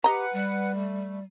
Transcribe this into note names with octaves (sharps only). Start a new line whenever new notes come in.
G4 B4 D#5 F#5 A#5
G3
A3